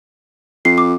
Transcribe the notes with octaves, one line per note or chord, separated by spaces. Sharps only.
F2 C7
D6